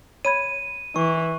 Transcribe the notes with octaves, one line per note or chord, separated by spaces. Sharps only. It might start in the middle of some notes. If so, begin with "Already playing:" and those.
C#5 B5 G#6 D#7
E3 C#6